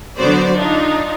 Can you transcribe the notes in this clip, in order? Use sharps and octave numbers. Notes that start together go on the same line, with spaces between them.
D3 F#3 B3 F#4 C5 D5
D4 D#4 F4